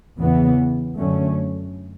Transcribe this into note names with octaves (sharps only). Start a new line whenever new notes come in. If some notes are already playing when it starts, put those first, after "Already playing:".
E2 C#3 E3 B3
F#2 D3 F#3 A3 C#4